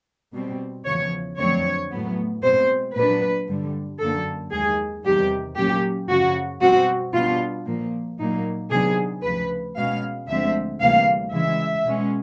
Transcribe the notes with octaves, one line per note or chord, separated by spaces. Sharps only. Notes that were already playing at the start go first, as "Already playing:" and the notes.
B2 G3 C4
E2 C#3 F3 C#5
F2 D3 F#3 A3 C4 C#5
A2 F#3 B3
B2 G#3 C4 C5
A#2 F#3 B3 D4 B4
G2 D3 G3
F#2 D3 F#3 A#3 A4
D#2 D#3 G#3 G#4
E2 C3 D#3 G3 G4
A#2 F#3 A#3 C#4 G4
F#2 C#3 F3 F#4
B2 G3 C4 F#4
B2 G3 B3 D4 F4
A#2 F3 A#3
A#2 F#3 A#3 D#4
C3 D#3 F#3 B3 D4 G#4
D2 C#3 F3 B4
B2 G#3 C#4 F5
D2 D3 F3 G#3 C4 E5
D2 C3 E3 G3 A#3 F5
C#3 E3 G#3 E5
B2 G#3 C#4